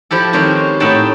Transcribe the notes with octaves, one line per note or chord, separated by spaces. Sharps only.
F3 E4 G4 A4
D#3 G#3 C4 C#4 G4
A2 D#4 E5 F#5 G5 A5